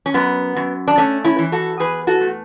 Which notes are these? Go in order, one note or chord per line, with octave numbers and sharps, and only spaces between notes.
C#4
F#2 B3
F#2
D4
A3 C#4
C#4 E4
E3
F#4 A4
E2 G#4 B4
F#4 A4
A3